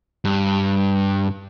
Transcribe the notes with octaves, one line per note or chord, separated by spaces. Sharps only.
G2